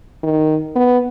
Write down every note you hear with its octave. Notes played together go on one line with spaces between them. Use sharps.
D#3
B3